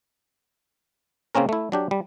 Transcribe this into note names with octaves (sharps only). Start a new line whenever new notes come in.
C#3 A#3 C4 C#4 A#4
A3 E4
F#3 D4 G4
G3